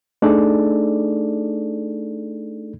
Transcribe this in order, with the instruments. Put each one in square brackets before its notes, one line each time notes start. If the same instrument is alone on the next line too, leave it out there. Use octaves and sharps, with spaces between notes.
[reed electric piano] A3 D4 D#4 G#4 A4 D5